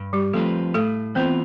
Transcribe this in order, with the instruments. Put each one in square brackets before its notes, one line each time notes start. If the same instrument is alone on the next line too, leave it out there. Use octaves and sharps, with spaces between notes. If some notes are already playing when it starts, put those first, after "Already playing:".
Already playing: [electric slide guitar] G2
[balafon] G3 G4
[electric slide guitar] F3 C4 F4 B4 [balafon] A3 A4
[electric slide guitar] A2 [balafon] A3 A4
[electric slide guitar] E3 B3 F4 [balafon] C4 C5